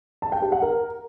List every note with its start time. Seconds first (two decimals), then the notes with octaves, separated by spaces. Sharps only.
0.22 A5
0.32 G5
0.42 G4
0.52 F#5
0.62 A#4